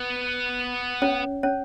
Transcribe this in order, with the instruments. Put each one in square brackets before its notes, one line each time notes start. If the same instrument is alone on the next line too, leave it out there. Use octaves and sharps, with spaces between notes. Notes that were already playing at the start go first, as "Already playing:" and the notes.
Already playing: [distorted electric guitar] B3
[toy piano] C#4 C#5
C#4 C#5